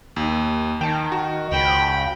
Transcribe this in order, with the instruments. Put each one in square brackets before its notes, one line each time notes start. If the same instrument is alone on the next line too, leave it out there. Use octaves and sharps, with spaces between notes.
[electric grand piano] D#2
[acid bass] D#3 [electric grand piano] G5 A5
[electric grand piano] F#4
[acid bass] C#2 [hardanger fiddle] G5 B5